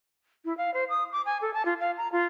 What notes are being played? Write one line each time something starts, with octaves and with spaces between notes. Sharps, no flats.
E4
F5
C5
D#6
D6
G#5
A4
A5
F4
F5
A#5
F4